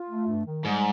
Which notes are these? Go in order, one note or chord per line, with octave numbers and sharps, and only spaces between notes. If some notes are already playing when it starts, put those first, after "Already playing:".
Already playing: F4
A3
G2
D#3
G#2 G3